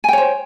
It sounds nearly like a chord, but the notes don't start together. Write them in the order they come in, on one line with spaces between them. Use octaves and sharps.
G#5 G5 C#5 C5